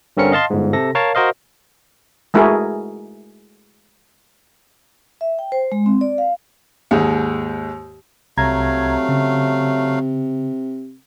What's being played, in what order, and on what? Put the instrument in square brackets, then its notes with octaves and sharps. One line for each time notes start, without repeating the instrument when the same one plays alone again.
[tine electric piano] G2 D3 C4 C#4 A#4 C#7
D#5 F5 A5 C6
G1 G#2
C3 A4 A#6
A#4 C#5 F5 A5
F#4 A#4 C5 D#5 F5
[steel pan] G#3 A3 E4 F#4 G#4 A#4
[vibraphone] E5
G5
C5
G#3
C4
D5
F5
[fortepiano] D#2 G#2
[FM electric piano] C2 A#5 G#6 [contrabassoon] C3 [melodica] F#3 A3 F5
[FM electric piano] C#3